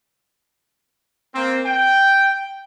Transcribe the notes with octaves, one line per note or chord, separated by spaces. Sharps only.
A#3 C4
G5